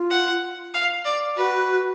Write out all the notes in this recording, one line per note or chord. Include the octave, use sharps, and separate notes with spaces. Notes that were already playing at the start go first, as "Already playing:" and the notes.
Already playing: F4
F#5
F5
D5
F#4 B4